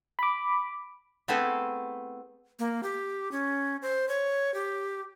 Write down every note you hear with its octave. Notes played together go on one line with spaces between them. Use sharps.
B5 D6
A3 B3 C4 E4 G#4 A4
A#3
G4
C#4
C5
C#5
G4